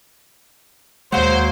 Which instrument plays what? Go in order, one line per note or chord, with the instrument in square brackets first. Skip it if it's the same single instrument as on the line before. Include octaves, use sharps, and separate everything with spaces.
[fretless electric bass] D#2 G#3 [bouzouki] F#3 A#3 [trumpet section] C5